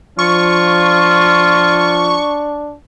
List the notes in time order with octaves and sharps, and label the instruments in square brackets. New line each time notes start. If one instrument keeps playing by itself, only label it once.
[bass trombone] F3 [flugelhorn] D4 [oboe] F4 [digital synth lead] C#6